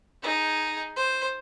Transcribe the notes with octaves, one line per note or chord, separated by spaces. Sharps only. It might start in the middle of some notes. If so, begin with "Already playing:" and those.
D#4 G#4
C5